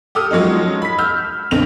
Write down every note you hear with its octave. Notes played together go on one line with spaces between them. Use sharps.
G4 A4 D#6 F6
F3 F#3 G#3 C#4 D#4
B5 B6
E6 F6 G6
B1 D3 C4 F7